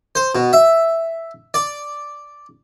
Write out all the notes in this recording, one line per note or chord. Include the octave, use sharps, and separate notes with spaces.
C5
B2
E5
D5